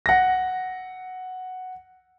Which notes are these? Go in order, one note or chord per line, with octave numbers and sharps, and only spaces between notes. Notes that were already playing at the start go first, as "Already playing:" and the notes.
F#5 A#6